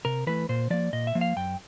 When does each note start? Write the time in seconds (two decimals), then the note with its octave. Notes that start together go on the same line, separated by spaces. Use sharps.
0.05 C3 A#4
0.27 E3 A3 B4
0.49 A#2 C5
0.70 F3 A#3 D5
0.93 A#2 D#5
1.07 E5
1.15 F3 A#3
1.21 F5
1.36 F#2 G5